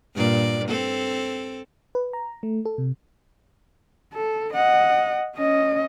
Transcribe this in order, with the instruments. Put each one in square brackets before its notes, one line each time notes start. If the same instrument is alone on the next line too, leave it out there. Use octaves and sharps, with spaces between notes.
[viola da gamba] G2 A#2 D5
C4 A4
[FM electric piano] B4
A#5
A3
A4
C3
[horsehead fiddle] A4
D#5 F#5
C#4 D#5